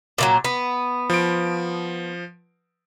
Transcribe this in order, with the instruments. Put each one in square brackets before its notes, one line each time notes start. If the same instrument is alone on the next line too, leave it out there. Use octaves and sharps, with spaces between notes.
[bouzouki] A#2 E3 F#3
B3
[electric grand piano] F3 D7